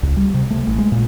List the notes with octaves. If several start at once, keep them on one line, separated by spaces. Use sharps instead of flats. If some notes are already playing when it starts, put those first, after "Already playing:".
C#2
G3
C3
A3
A1
G#3
A#2